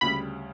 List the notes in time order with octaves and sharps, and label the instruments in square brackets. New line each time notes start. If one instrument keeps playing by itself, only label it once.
[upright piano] D2 C#3 G3 [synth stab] B5